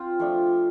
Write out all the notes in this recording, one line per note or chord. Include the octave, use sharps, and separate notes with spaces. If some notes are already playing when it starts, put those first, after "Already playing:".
Already playing: C4 F4
F3 A3 D4